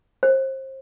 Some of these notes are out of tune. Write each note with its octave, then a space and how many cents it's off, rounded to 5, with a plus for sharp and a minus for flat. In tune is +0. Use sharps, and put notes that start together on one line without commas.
C5 +30